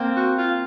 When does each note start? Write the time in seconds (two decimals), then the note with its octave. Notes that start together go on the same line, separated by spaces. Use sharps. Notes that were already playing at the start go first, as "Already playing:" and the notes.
Already playing: A#3 C4
0.16 F#4
0.37 F4